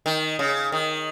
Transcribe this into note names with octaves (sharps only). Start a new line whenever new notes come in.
D#3
C#3
D#3